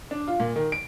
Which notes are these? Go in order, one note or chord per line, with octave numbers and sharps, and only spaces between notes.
D4
F4
A#2
D#3
D7